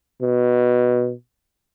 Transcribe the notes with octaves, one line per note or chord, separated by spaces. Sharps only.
B2